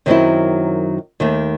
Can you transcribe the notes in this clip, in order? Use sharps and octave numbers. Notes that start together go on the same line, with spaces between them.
F#2 D#3 F#3 C4 E4
D#2 D#3 A3